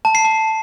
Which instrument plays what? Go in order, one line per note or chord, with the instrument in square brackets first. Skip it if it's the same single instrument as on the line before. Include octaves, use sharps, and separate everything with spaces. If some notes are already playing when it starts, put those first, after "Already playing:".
[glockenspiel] A5
C7
A5